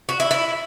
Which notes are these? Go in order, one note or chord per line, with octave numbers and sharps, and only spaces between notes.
F#4
E4
E4